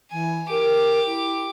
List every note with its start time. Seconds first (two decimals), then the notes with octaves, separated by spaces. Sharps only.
0.11 E3 G#5
0.49 G4 A#4 D6
1.06 E4